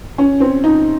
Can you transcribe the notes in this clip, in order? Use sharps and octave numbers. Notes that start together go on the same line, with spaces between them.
C#4
C4
D#4